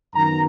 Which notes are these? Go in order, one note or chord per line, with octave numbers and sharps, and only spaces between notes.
F#2 D#3 F#3 B3 A#5